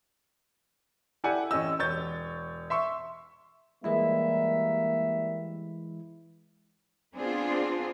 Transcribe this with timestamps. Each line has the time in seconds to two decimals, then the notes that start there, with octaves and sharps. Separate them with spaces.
1.24 E4 G4 A4 D5 F#5 G#5
1.51 A1 C#4 G4 D#5 E6
1.79 E1 C#5 G6 A6
2.70 E5 C6 C#6
3.84 E3 G3 G#3 A#3 E4 E5
7.17 B3 C4 D4 F4 G#4